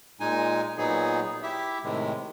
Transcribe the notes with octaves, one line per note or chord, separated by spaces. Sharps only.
A#2 G#3 D#4 G#5
A#2 F#3 B3 D#4 G#4
E4 G4 E5
A2 C3 D#3 G#3